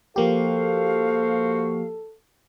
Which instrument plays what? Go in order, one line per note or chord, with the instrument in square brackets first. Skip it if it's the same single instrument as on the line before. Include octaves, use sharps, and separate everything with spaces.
[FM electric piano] F3 A#3 G4 [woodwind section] F#4 C5 F5 [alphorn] A4